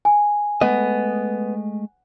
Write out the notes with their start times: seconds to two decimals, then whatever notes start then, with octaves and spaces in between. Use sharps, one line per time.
0.05 G#5
0.61 G#3 A3 B3 D#5